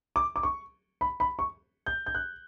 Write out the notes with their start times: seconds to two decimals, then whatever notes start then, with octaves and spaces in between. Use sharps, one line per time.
0.16 D6
0.36 D6
0.43 C#6
1.01 B5
1.20 B5
1.39 C#6
1.86 G6
2.06 G6
2.15 F#6